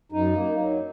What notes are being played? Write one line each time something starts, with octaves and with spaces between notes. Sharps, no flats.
F#2 D#4
A#3
F#3